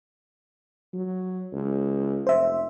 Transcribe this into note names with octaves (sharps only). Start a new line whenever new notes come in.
F#3
C#2
F1 C5 E5